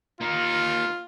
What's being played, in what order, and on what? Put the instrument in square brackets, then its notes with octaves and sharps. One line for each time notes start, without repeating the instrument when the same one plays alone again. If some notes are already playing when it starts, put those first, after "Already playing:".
[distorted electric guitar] A#3 D#4 [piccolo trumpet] F4